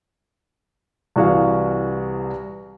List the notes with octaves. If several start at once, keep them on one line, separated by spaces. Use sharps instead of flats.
C2 E3 F#4 G#4 F5